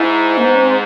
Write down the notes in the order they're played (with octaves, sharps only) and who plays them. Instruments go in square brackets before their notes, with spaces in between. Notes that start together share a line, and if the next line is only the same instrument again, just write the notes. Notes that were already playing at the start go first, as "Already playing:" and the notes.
Already playing: [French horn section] G#2 [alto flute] E4
[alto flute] A#3
B3
C#4
C4